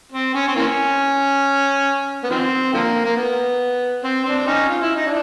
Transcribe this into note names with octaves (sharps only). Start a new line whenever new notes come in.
C4
C#4
C4
E3 A#3 C#4
B3
D#3 F3 C4
D3 F3 A#3
A#3
B3
C4
C4 D4
C#4 D#4
F4
E4
D#4
D4 E4